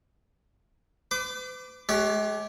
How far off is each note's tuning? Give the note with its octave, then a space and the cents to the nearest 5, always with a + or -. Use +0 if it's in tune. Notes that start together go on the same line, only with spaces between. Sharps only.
B4 +45 D6 +0
G#3 +40 G4 -10 C#5 +0